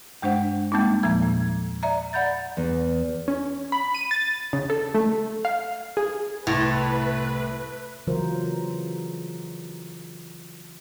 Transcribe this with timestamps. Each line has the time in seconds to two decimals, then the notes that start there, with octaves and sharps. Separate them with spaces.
0.22 G2 G#3 D4 C5 F#5
0.72 G3 G#3 A#3 C4 D#4
1.03 E2 A#2 F3 G#6
1.23 A#2
1.83 D5 E5 A#5
2.13 D5 F#5 B5 G6 A6
2.57 E2
3.28 C#4
3.72 B5
3.95 D#7
4.11 A6
4.53 C#3
4.70 A4
4.94 A3
5.45 F5
5.97 G#4
6.47 C2 A2 B4 C6
8.07 C#3 E3 F#3 F4 A#4 C5